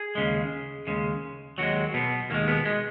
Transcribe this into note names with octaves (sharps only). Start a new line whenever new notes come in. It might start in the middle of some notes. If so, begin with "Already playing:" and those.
Already playing: G#4
D#2 C#3 G#3
D#2 C#3 G#3
D#2 D#3 F#3 G#3 F#4
B2 B3
D#2 D#3 G#3 A#3
B2 B3
G#3